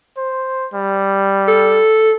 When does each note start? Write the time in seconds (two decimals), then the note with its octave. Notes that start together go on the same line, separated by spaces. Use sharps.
0.17 C5
0.73 G3
1.48 A4